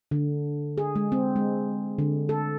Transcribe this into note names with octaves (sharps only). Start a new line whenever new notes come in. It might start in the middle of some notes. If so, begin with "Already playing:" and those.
D3
G#4
G#3
C4
G#3
D3
A4